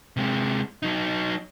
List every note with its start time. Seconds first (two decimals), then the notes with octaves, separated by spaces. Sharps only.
0.17 C3 G#3
0.83 F#3 D#4